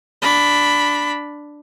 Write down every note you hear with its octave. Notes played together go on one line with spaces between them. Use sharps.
D4 B5